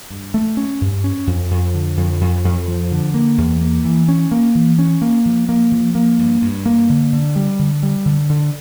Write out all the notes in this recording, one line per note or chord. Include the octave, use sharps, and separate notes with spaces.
G2
A3
C#4
G2
C#4
F2
F2
D3
F2
F2
F2
F3
D3
A#3
E2
A#3
E3
C#4
A#3
E3
C#4
A#3
F3
A#3
F3
A#3
G2
G2
A#3
D3
D3
G3
D3
G3
D3
D3